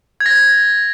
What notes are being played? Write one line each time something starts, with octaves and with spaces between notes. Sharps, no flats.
G#6
A#6
G#6